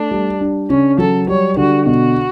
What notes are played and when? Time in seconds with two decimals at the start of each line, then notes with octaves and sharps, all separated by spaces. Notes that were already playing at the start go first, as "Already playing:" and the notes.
Already playing: A3 D4
0.11 G3
0.41 D4
0.69 C#3 C#4
0.98 F#3 A4
1.28 G3 C#5
1.57 D3 F#4
1.86 B2 F#4